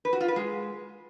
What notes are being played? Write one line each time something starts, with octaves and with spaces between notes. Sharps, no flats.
B4
F#4
F4
B4
G#3